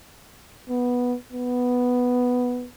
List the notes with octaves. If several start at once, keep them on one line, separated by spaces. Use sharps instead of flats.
B3
B3